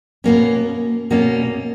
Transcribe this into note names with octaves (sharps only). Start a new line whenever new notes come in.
B2 A#3 C#4
B2 A#3 C#4